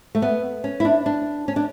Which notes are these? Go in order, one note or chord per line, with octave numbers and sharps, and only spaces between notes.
A3
B3
C#4
E4
D4
D4
C#4
D4